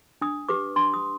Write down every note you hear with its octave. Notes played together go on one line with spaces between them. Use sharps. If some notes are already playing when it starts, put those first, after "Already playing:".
D4 D#6
G4 B4 D6
D4 C6
D#6